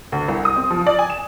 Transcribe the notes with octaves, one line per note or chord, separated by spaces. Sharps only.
D2
C2
D#6
C4
F3
D5
G#5
E7